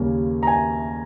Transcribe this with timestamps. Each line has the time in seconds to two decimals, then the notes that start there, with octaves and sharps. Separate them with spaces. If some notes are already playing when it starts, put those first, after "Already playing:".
Already playing: D#2 C#3 G3 A#3 C#4
0.43 A#5
0.47 G#5